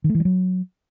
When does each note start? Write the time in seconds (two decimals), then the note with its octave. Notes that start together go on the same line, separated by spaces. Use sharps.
0.04 D#3
0.09 A3
0.15 E3
0.20 G3
0.25 F#3